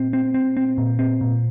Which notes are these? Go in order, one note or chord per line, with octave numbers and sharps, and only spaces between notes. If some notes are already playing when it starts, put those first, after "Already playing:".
Already playing: A#2 C4
C4
C4
C4
A#2
C4
A#2